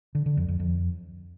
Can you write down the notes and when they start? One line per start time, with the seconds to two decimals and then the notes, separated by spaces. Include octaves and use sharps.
0.15 D3
0.26 D3
0.37 F2
0.48 F2
0.60 F2